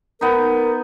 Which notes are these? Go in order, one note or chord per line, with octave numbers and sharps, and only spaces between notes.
B3 D#4 A#4